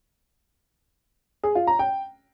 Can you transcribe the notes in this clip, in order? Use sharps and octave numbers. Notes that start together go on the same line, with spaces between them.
G#4
F4
A#5
G5